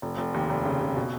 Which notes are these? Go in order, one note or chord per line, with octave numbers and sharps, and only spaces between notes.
F1
F1
D#2
F1
C#3
C#3
B2